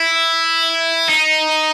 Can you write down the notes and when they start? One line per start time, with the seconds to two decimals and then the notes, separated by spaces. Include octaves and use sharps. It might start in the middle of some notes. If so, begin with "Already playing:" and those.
Already playing: E4
1.09 D#4